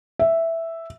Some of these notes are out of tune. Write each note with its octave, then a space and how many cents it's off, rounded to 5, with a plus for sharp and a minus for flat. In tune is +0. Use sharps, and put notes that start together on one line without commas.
E5 +0